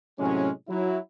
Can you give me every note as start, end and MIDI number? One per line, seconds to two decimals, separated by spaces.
0.19 0.49 45
0.19 0.49 48
0.19 0.49 54
0.19 0.49 56
0.19 0.49 61
0.69 0.98 54
0.69 0.98 64